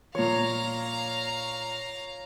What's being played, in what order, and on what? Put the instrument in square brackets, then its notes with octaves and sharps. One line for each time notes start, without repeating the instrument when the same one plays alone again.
[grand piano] A#2 F3 [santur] C#5 [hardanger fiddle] F5 A#5